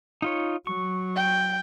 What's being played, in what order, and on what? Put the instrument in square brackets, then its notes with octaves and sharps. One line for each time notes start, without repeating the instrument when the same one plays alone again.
[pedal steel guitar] D#4 F4 C#5
[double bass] F#3 [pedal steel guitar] C#6
[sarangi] G5